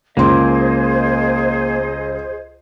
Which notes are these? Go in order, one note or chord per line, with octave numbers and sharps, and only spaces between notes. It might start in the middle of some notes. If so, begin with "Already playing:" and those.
C#2 A#3 G#4 C5 D#5 C6